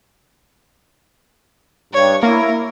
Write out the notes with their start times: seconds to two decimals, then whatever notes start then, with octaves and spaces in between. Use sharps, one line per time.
1.93 G2 C#5
2.23 A#3 E4 A#4